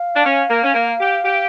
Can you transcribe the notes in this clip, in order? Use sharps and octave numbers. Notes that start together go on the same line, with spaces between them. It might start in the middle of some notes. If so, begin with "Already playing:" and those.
Already playing: F5
D4
C#4
A#3
C#4
A#3
G4
G4